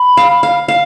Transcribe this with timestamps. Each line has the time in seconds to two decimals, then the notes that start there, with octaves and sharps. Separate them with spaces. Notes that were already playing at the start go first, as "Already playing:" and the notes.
Already playing: B5
0.17 F5
0.43 F5
0.68 F5